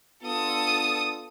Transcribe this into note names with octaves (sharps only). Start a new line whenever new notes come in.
B3 D4 F4 A4 D#6